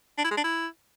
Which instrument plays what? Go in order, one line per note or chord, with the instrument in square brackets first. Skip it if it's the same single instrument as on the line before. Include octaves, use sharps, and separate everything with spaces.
[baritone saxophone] D4
E4
G#3
D4
E4